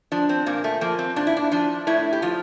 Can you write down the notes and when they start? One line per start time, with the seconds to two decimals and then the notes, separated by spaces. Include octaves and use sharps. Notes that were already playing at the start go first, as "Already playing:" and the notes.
0.12 F3 D4
0.29 C4
0.46 A#2 A#3
0.64 A3
0.81 F3 A#3
0.99 C4
1.16 A#2 D4
1.27 E4
1.37 D4
1.52 F3 D4
1.87 A2 E4
2.13 G4
2.22 F3 F4